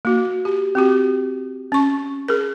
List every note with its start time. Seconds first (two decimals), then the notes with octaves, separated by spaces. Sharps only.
0.05 A#3 F#4
0.45 G4
0.75 C4 F#4 G4
1.72 C#4 C#6
2.28 G#4 A#4